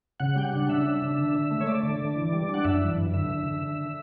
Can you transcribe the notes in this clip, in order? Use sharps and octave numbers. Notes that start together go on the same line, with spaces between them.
C#3 F#5
G3 G5
F#5
D4
C#3 E5
D4
D4
D3
D3
A3
C#5
A3 D5
D3
D3
E3
G3
D4 F#5
F#2 E5
E3
F#2
D3 E5
D3
D3
D3